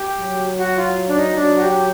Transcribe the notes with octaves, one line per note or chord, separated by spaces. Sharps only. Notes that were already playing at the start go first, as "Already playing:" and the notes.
Already playing: G4
F#3
F#4
F4
D4
D#4
F#3 D4
F#4
G4